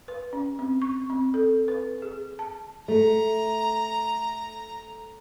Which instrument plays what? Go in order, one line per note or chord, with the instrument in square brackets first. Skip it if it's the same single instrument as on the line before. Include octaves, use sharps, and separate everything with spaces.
[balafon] B4
C#4
C4
C#6
C4
A4
B4
G#4
A5
[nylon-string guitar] A3 [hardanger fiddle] A#5